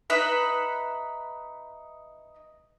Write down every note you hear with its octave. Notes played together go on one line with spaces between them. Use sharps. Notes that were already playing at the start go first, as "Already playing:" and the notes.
D#4 B4 E5 B5